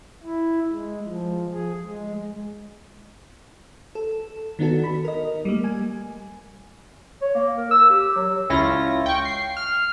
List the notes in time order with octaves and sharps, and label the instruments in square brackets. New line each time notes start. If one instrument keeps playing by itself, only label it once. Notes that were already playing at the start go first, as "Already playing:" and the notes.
[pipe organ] E4
G#3
F3
G#4
G#3
[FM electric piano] A4
D#3 B3 D4 D#4 F#4 A4
B5
A#4 D#5
G3 A3 A#3
G#5
[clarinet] C#5
A#3
A#4
E6
G4
F#3
[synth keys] C#2 C#4 E4 F4 A#6
G5 C#6
C7
F6